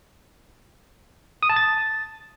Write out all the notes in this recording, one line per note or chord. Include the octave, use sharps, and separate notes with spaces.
D#6
A5
A6